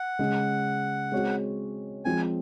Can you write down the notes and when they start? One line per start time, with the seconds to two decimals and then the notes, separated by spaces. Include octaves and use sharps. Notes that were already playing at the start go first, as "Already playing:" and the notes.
Already playing: F#5
0.19 C#3 G#3 C#4
1.12 G#3 C4 F#4 C#5
2.05 F3 G#3 C4 G#5